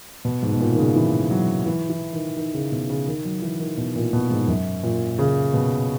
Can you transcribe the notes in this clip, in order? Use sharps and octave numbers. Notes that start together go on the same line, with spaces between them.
B2
G#2
B2
A#2
D#3
C#3
E3
F#3
E3
E3
D#3
D#3
C#3
B2
C#3
D#3
F#3
E3
D#3
B2
A#2
B2
G#2
F#2
A#2
C#3
B2